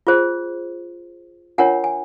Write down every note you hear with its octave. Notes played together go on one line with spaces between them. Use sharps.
F4 G#4 C5
D4 F4 A#4 C#5 F#5 G#5
G#5